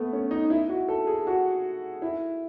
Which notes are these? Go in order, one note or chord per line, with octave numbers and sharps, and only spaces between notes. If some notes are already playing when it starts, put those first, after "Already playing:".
Already playing: A3 B3
C#4
D#4
E4
F#4
A4
G#4
F#4
E4